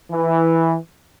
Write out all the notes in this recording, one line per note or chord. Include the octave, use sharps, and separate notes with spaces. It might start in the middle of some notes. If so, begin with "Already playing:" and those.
E3